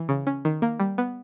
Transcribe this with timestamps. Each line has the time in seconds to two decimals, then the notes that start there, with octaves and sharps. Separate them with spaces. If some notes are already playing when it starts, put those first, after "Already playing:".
Already playing: E3
0.09 C#3
0.27 C#4
0.45 D#3
0.62 A#3
0.80 G3
0.98 B3